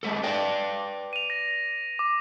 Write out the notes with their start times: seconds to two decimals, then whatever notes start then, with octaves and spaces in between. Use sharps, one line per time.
0.03 G#3 B3 A4
0.23 B4 D5 G5
1.13 D#7 F7
1.30 A#6
1.99 D6